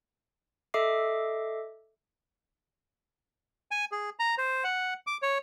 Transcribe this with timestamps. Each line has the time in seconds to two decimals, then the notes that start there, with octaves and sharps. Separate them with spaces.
0.74 A4 D#5 E5 D6 C7
3.71 G#5
3.92 G#4
4.19 A#5
4.38 C5
4.64 F#5
5.07 D6
5.22 C#5